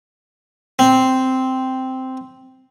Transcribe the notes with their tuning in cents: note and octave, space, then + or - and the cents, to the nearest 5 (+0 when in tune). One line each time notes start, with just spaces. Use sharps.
C4 -5